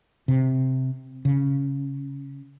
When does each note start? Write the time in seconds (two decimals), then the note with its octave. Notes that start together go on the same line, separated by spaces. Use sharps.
0.28 C3
1.25 C#3